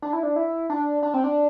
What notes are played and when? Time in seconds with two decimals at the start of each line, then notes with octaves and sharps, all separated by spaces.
0.02 D4
0.13 E4
0.23 D4
0.36 E4
0.70 D4
1.03 D4
1.14 C4
1.24 D4